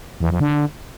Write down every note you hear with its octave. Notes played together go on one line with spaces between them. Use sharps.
E2
F2
D3